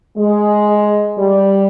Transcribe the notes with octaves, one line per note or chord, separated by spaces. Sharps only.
G#3
G3